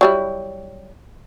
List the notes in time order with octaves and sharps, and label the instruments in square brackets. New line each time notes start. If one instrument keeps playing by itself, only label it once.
[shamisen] F#3 G3 E4